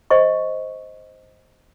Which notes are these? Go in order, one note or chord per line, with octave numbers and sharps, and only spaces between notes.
C5 D#5 C#6